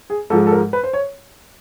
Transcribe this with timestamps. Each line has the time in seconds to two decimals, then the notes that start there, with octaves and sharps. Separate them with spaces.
0.10 G#4
0.30 G#2 F3 G#3 A4
0.47 A4
0.52 A#4
0.73 B4
0.83 C5
0.93 C#5